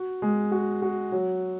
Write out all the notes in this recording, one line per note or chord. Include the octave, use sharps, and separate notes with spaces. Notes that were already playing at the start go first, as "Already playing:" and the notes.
Already playing: F#4
G#3
F#4
F#4
F#3